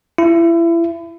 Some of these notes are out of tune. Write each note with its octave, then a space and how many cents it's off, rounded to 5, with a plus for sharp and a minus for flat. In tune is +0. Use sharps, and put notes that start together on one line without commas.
E4 +30